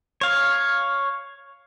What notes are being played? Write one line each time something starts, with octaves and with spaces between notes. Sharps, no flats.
C#5 F5